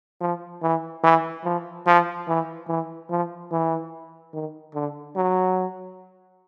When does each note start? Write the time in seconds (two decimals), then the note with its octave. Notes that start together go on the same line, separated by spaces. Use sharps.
0.21 F3
0.62 E3
1.03 E3
1.45 F3
1.86 F3
2.28 E3
2.68 E3
3.10 F3
3.51 E3
4.33 D#3
4.74 D3
5.16 F#3